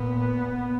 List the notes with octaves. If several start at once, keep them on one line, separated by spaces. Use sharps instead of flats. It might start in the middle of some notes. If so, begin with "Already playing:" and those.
Already playing: A#2 B3